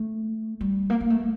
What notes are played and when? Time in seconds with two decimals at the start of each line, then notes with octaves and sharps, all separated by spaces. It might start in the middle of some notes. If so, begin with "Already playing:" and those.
Already playing: A3
0.61 G3
0.90 A#3
1.00 A#3
1.10 A3